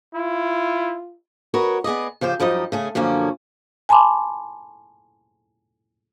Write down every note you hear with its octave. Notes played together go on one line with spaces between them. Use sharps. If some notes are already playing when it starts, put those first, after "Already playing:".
E4 F4
F#4 A#4 B4 C#5 D#5
B3 G#4 D5 D#5
C#3 F3 G4 C5
F#2 F3 G3 D#4 D#5
C#3 A3 G#4
F#2 D3 F3 A#3 C#4
G#5 A5 B5 C6 D6